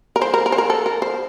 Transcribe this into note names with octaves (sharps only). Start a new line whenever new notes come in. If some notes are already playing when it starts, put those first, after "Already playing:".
A#4
C5
A#4
A#4
C5
A#4
A4
A#4
C5